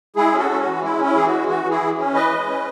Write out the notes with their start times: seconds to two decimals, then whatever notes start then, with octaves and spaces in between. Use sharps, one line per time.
0.16 G#3 E4 G#4
0.33 C#4
0.38 F#4 A4
0.50 C#4
0.61 F#4
0.66 E3
0.82 G#3 E4
0.99 C#4
1.04 E4
1.16 E3 G#4
1.26 F#4
1.32 G#3
1.48 E3 F#4
1.64 E3
1.70 E4 G#4
1.81 E3
1.98 C#4
2.14 E3 B4 D#5
2.31 G#3
2.47 C#4